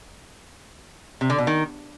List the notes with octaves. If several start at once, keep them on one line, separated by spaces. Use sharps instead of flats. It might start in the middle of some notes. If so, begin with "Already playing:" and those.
C3
D3
B2
D#3